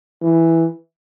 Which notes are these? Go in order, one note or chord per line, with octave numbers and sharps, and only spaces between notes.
E3